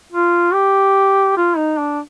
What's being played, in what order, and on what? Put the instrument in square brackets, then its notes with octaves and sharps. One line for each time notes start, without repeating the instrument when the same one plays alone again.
[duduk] F4
G4
F4
D#4
D4